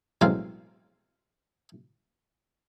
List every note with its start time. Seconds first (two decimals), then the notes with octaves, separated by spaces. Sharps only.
0.21 A1 B2 F#3 G#3 C4 F5